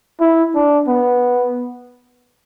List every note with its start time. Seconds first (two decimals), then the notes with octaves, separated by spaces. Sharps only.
0.20 E4
0.55 D4
0.88 B3